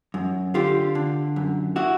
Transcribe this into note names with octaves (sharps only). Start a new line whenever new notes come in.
F#2
D3 F4 G4
D3
F#2
E4 F#4